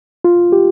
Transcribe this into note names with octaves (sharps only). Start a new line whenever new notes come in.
F4
G4